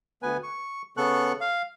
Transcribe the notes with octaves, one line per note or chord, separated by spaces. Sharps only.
D2 B3 B4 G#5
C#6
C#3 B3 A4 C#6 F#6
F5